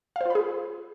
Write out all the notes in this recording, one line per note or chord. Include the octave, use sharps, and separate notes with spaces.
F4 G#4 C5 F5 B5